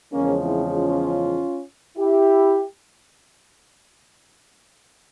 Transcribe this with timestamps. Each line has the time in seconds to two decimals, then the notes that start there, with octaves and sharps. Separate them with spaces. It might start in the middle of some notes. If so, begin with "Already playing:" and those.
0.12 E2 C#3 F3 G#3 A#3 C#4
0.43 C4 E4
0.74 C#4 F4
1.98 E4 G4